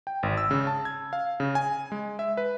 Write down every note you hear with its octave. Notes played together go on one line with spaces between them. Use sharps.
G5
G#1
E6
C#3
A5
G#6
F5
C#3
G#5
G#3
E5
B4